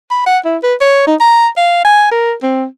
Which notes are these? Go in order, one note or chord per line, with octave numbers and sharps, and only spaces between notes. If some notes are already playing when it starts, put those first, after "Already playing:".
B5
F#5
E4
B4
C#5
D#4
A#5
F5
G#5
A#4
C4